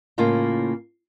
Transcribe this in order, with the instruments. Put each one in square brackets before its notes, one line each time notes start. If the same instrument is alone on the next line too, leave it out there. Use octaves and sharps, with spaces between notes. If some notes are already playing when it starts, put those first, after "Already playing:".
[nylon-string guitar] A2 C#3 A#3 F4